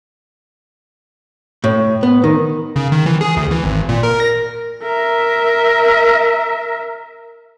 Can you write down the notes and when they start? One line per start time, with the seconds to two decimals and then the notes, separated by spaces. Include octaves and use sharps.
1.64 A2
2.03 B3
2.24 D#3
2.76 C#3
2.92 D#3
3.06 E3
3.21 G#4
3.37 D2
3.51 E3
3.64 G#1
3.89 A#2
4.03 A#4
4.20 A#6
4.83 A#4 E5